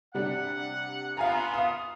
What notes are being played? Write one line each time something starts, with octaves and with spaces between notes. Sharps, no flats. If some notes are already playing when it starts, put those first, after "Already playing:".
C3 G3 D4 F#5
B3 F4 F5 G#5 A#5
F5 D#6